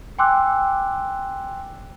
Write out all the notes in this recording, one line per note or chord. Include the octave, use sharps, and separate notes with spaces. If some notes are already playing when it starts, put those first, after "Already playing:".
G5 G#5 C6 D6 E6 F#6